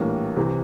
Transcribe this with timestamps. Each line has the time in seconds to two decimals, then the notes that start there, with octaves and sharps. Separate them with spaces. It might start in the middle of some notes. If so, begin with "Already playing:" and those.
Already playing: A#1 A2 E3 G3 A#3
0.36 C2 C3 E3